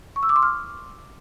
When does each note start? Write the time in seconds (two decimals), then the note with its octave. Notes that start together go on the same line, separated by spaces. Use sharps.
0.16 C#6
0.23 E6
0.29 D6
0.36 C6
0.43 F6